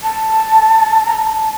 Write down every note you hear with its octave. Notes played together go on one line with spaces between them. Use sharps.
A5
A#5
A5